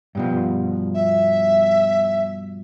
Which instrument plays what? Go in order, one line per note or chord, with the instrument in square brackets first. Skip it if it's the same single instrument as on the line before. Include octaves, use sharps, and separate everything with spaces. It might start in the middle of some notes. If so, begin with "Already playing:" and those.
[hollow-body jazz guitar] G2 B2 F3
[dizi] E5